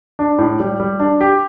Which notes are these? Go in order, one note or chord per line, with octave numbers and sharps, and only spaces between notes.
D4
A2
G3
G3
D4
G4